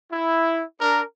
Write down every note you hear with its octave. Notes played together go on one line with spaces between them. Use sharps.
E4
D4 A#4